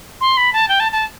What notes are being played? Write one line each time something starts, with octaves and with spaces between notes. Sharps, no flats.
C6
B5
A5
G5
A5
A5